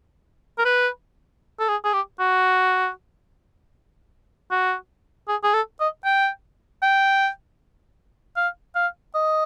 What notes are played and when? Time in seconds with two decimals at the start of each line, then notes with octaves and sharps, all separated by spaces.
0.58 A#4
0.65 B4
1.59 A4
1.68 G#4
1.84 G#4
1.93 G4
2.19 F#4
4.51 F#4
5.28 G#4
5.43 G#4
5.53 A4
5.80 D#5
6.04 G5
6.82 G5
8.36 F5
8.75 F5
9.15 D#5